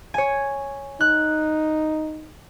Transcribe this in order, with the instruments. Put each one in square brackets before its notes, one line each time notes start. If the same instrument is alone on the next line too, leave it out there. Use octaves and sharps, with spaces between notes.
[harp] C#5 G#5
[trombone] D#4 [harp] F#6